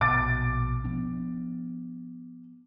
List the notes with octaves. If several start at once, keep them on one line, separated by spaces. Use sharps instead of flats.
A#1 B2 D6 A6 D7
F3 B3 D4